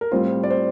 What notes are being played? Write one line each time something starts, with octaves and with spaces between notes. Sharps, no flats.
A#4
A2 G3 C4 F4 C5
D5
C5